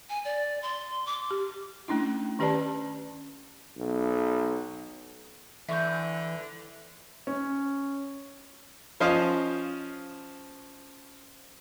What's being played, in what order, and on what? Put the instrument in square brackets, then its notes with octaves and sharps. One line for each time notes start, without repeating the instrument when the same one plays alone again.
[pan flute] G#5
D5
C6
D6
[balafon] G4
A3 C#4 D4 E4
D#3 C#4 G4 B4 D5 A5
[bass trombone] B1
[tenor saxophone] D3 [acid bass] E3 [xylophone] E5 C#6 G6
[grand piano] C#4
[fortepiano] F3 C#4 C5 D#5 F5